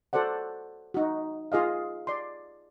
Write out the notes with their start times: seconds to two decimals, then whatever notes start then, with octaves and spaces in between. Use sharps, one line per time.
0.13 F#4 A4 C5 D5 F#5
0.94 D#4 F#4
1.52 F4 G#4 D#5 F5
2.07 D5 C6